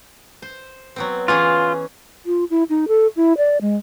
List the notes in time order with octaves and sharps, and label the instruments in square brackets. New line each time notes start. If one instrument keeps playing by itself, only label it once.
[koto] C5
F#3 B3 C4
[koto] E3 C#4 G#4 [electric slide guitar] F4
[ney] F4
E4
D#4
A4
E4
D5
G#3